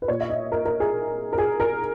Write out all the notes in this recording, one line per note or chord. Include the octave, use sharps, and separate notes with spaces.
B4
A#2 C#5
E5
D#5
A#4
A#4
G#4
A#4
G#4
A#4